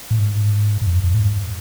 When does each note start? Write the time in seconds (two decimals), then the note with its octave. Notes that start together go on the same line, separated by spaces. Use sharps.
0.11 A2
0.19 G#2
0.81 G#2
0.87 F2
1.04 F2
1.14 A2
1.20 G#2